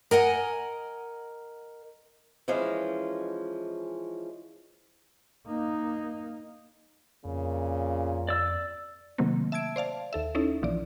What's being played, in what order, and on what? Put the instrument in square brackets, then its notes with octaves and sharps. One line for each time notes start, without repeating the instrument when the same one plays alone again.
[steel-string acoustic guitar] A#4 D#5 F#5 G#5
E3 F3 G#3 C#4
[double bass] A#3 D#4
[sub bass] F2 [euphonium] A#2 [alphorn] C#3
[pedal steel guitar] D5 E6
[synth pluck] C3 D#3 F#3 A3 A#3 C4
E5 A5 E6 G#6 D7
C5 D5 F5 A5
D#2 A4 E5
C#4 D#4 E4 A4
A#1 E3 F3 D5